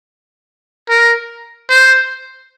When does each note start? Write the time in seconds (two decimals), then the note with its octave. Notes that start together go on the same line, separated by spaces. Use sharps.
0.89 A#4
1.69 C5